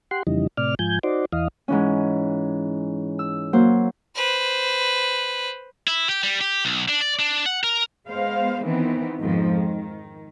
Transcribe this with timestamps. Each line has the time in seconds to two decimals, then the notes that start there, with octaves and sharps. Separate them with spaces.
0.11 G4 F#5 C6
0.27 F2 C#3 E3 G3 D#4
0.57 A2 C3 D5 F6
0.79 G#2 F3 G#5 G6
1.03 D#4 F#4 C5 D5
1.32 E2 E3 D#5 F5
1.68 G#2 E3 C#4
3.19 E6
3.53 F#3 A#3 C5
4.16 B4 C5
5.87 E4
6.09 G4
6.23 G3
6.41 G4
6.65 B1
6.89 D4
7.01 D5
7.19 D4
7.46 F#5
7.63 A#4
8.05 G#3 B3 C5 F5
8.63 D#3 E3 B3 C4
9.20 F2 G#2 D#3 F3
9.52 D#3